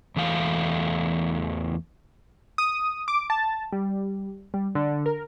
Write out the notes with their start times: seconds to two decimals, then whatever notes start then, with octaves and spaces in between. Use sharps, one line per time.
0.16 E2 E3 A3 F5
2.58 D#6
3.08 D6
3.30 A5
3.72 G3
4.54 G3
4.75 D3
5.06 A#4